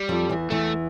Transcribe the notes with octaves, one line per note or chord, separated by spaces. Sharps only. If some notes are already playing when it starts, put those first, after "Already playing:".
Already playing: G3
F2 F3
E2 E3
E2 E3 A3